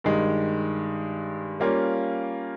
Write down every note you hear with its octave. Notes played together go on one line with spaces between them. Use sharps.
G2 D#3 G#3
G3 A#3 C#4 F4